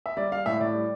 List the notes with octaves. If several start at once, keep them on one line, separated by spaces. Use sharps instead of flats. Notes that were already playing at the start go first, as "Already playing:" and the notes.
E5
G3 D5
G3 F5
A2 E5
A2 D5
G3